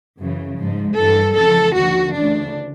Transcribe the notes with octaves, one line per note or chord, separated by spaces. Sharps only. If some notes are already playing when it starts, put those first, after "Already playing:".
F#2 C#3 E3
G#2 F3
G2 E3 A4
F2 C#3 E3 A4
D#2 D3 F3 F#4
D2 C#3 E3 D4